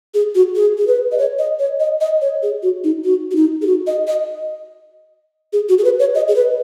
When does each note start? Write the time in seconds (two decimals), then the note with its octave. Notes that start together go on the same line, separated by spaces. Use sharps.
0.14 G#4
0.35 F#4
0.56 G#4
0.78 G#4
0.87 B4
1.12 D#5
1.18 C#5
1.39 D#5
1.59 C#5
1.80 D#5
2.01 D#5
2.22 C#5
2.43 G#4
2.63 F#4
2.84 D#4
3.04 F#4
3.31 F#4
3.36 D#4
3.62 G#4
3.67 F#4
3.87 D#5
4.07 D#5
5.53 G#4
5.69 F#4
5.78 G#4
5.84 B4
5.99 C#5
6.15 D#5
6.28 G#4
6.36 B4